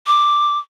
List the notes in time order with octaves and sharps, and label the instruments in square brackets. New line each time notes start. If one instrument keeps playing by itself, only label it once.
[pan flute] D6